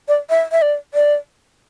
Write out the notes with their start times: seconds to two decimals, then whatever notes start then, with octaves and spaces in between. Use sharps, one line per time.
0.08 D5
0.30 E5
0.52 E5
0.62 D5
0.94 D5